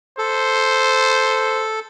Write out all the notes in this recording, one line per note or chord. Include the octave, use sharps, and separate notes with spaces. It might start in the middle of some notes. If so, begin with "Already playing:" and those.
A4 C5